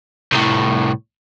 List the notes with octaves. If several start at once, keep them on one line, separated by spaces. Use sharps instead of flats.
C2 A2